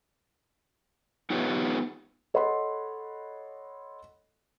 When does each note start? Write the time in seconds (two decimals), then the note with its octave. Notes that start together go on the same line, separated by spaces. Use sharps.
1.30 B3 D#4 F4 G4 B4 C#5
2.34 A4 C#5 D#5 F#5 B5 C6